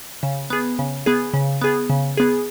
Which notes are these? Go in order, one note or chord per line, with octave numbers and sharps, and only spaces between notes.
C#3
B3 G#4
C#3
B3 G#4
C#3
B3 G#4
C#3
B3 G#4